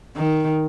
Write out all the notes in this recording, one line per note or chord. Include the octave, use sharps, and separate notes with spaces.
D#3